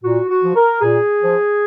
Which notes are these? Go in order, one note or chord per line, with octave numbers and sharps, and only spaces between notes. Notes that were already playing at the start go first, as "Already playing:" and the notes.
A#2 F#4
F#4
F3
A#4
A#2 G#4
F3